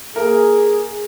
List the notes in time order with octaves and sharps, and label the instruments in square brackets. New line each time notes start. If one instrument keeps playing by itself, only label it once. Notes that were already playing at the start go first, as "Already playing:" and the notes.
[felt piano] A#3 A#4 [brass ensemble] G#4